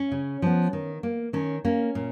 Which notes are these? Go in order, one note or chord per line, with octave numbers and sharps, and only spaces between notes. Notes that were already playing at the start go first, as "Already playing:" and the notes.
Already playing: C#4
C#3
F3 B3
D#3
A#3
D#3 C#4
A#3 C#4
A#2